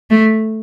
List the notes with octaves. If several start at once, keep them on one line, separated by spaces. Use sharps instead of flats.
A3